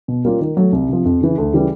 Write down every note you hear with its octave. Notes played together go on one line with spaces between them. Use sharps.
B2
G3 A#3 C#4 F4
D#3
F#3 A3
C2
C3 F3
F2
C#3 E3
D2
C#3 E3 G3